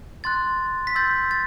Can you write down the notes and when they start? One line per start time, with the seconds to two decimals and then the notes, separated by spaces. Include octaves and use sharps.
0.24 C6 F#6 A6
0.87 B6
0.95 C6 E6 G6 A6
1.31 A6